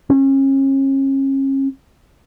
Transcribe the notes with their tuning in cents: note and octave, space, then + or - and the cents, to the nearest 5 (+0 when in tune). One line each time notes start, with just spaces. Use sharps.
C#4 -35